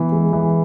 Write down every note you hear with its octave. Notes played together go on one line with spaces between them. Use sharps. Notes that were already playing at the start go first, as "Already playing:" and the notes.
Already playing: E3 B3
G#3
E3